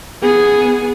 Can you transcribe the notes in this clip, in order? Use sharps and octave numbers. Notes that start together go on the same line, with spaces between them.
B3 G#4